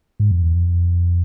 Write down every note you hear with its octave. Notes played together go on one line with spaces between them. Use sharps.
G#2
F2
E2
F2